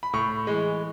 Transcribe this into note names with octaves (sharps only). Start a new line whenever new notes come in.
B5
A2 C#6
E3 G#3